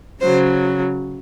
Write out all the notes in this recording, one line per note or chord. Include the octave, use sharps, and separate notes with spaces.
C#3 F#3 C5